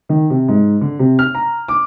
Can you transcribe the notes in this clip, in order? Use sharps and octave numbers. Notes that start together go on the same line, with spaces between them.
D#3
C3
G#2
D3
C3
F6
A#5
D6